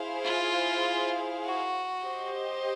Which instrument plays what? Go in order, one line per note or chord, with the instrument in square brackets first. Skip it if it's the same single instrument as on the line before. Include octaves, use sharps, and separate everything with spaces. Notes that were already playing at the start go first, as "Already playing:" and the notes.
Already playing: [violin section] E4 G#4 C5 F5
[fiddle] F4
F#4
[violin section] G4 C5 D#5